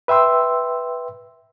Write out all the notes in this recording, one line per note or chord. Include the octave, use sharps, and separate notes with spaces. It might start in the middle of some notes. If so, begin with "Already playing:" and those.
B4 E5 G5 C6 E6